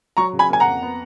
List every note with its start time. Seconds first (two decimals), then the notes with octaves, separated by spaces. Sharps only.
0.17 F#3 A#5 C#6
0.33 C#3
0.39 G#5 B5
0.50 A#3 G#5
0.60 F#5 A#5
0.66 F2
0.82 B3